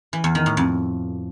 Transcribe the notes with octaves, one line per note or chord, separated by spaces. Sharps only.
E3
E2
D#3
A2
F2